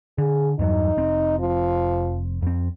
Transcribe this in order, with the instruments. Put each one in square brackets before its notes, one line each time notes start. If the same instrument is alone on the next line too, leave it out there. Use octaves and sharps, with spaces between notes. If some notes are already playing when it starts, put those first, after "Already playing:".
[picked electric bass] D3 [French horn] G#4
[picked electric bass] E2 G2 F#3 [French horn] D#4
[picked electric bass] F1 C4
[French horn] F3
[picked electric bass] F2 C4